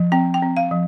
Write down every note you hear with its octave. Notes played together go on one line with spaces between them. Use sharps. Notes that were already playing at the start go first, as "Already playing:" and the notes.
Already playing: F3
C4 G5
G5
C4
F5
F3